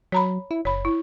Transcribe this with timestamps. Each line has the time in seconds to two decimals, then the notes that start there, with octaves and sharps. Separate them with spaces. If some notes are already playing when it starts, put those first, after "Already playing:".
0.12 F#3 C#5 A#5 B5
0.51 E4
0.65 F#1 C#5 B5
0.85 E4